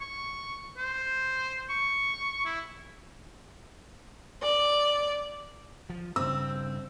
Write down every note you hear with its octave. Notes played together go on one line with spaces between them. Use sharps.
C#6
C5
C#6
E4
D5
F3
G2 C#3 C4 E6